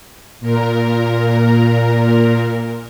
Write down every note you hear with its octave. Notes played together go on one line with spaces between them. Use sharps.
A#2 A#4